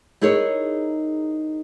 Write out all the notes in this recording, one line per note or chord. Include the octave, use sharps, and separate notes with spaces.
D#4 E4 G#4 A#4 C#5